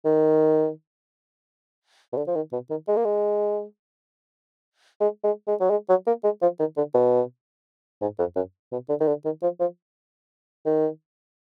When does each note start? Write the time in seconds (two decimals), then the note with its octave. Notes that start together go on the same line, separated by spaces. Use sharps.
0.05 D#3
2.13 B2
2.17 D3
2.28 F3
2.35 D#3
2.53 B2
2.70 D#3
2.88 G#3
2.97 A#3
3.05 G#3
5.00 G#3
5.24 G#3
5.47 G#3
5.60 F#3
5.70 G#3
5.89 F#3
6.07 A#3
6.24 G#3
6.42 F3
6.59 D#3
6.77 D3
6.94 B2
8.01 G#2
8.19 F2
8.36 F#2
8.72 B2
8.89 D3
9.00 D#3
9.07 D3
9.25 D#3
9.43 F3
9.60 F3
10.66 D#3